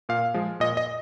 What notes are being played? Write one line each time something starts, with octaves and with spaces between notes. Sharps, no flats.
A#2 F5
F3 G#3
A#2 D#5
D#5